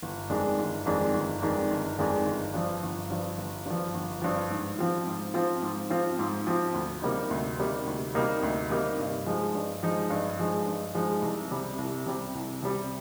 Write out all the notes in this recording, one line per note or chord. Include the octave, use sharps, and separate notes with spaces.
G1
F2 D#3 G#3 D4
G1
F2 D#3 G#3 D4
G1
F2 D#3 G#3 D4
G1
F2 D#3 G#3 D4
G1
G2 F3
G1
G2 F3
G1
G2 F3
G1
G2 F3
G#2
F3 C4 F4
G#2
F3 C4 F4
G#2
F3 C4 F4
G#2
F3 C4 F4
D2
C3 G3 A#3 D#4
D2
C3 G3 A#3 D#4
D2
C3 G3 A#3 D#4
D2
C3 G3 A#3 D#4
G2
F3 G#3 D#4
G2
F3 G#3 D#4
G2
F3 G#3 D#4
G2
F3 G#3 D#4
C2
C3 G3
C2
C3 G3
C2
C3 G3